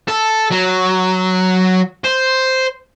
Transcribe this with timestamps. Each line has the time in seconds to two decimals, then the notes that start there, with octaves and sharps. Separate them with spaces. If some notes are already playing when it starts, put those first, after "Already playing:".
0.08 A4
0.51 F#3
2.04 C5